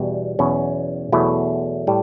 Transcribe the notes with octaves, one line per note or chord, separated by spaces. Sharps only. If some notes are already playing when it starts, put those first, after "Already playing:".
Already playing: E2 B2 G3
E2 B2 F#3 C#4
E2 B2 F#3 A3 E4
A2 G3